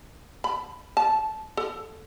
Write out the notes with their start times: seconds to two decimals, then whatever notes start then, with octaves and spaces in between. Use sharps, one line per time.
0.44 B5
0.97 A5
1.57 A4